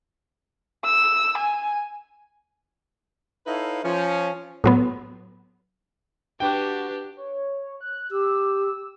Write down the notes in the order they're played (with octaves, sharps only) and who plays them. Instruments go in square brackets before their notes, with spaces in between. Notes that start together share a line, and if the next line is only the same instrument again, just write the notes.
[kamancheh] E6
G#5
[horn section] D#4 E4 A4 B4 C#5 F5
F3 C#4
[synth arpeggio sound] A2 F#3 B3
[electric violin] D4 G4 [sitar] F#4 B4 [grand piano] G5
[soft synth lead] C#5
F#6
[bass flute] G4 [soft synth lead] E6